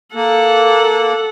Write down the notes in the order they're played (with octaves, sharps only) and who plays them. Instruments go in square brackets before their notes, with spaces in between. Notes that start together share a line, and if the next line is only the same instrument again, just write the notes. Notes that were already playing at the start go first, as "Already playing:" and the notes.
[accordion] A#3 [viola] A4 F#5